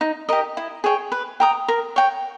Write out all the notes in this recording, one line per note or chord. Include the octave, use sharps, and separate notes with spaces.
D#4
G4 A#4 D#5
E4
G#4 C#5 G5
B4
G5 A#5 D#6
A#4
C#5 G5